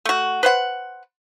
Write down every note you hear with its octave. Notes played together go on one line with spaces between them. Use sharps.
A3 F#4
B4 C5 F#5